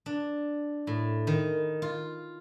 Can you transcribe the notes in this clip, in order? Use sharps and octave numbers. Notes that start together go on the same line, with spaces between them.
D4
A2
D#3
F4